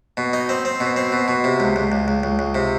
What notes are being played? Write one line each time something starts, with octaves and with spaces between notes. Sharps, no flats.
B2
D#4
C4
C4
B2
C4
B2
B2
C3
C#2
C#2
C#2
C#2
C#2
C#2
C3